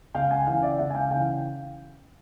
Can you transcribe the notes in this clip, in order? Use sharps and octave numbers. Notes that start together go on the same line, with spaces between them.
C#2 F5 G5
F#5 G#5
C#3 E3 F5 G5
D5 E5
C#2 E5 F#5
G#5
F5 G5
C#3 E3 F5 G5